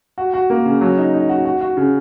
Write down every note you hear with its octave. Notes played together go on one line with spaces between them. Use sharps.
F#4
F#4
A#3
C#3
F#3
D#4
D#4
F#4
F#4
F#4
C#3